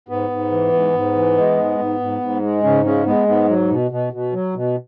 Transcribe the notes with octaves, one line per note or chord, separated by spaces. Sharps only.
G#2 B3
G#2
E3
G#2
G#2
E3
G#3
G#2
G#2
G#2
G#2
G#3
G#2 C#3 C#4
C#3 G#3 C#4
G#3 B3
G#2 B3
F#3
B2
B2
B2
F#3
B2